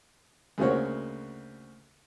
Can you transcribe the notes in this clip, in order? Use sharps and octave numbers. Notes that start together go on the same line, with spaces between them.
D2 C#3 A#3 F#4 C5 C#5